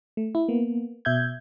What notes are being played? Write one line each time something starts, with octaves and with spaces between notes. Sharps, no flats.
A3
E4
A#3 B3
B2 E5 G6 G#6